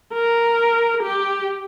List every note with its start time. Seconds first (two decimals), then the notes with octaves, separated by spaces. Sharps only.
0.13 A#4
1.03 G4